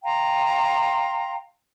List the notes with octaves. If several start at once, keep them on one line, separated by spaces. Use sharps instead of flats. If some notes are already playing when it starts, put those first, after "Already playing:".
F5 G5 A#5 C6